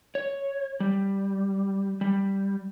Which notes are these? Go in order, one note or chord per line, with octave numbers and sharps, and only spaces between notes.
C#5
G3
G3